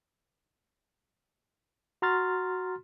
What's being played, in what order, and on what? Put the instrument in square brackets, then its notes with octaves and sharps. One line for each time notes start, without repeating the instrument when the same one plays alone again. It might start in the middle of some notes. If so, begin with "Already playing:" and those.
[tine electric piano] F#4 A#5 C6 F6 A6